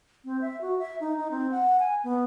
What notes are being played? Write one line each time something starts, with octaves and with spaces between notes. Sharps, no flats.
C4
E5
F#4
E5
D#4
D#4
C4
F#5
G#5
B3